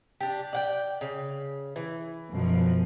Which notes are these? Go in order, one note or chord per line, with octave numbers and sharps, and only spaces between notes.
D4 G4
D5 F#5 G5
C#3
E3
F#2 B2 F3